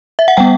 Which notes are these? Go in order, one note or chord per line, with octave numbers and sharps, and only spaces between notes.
E5
F#5
G3 B3 G5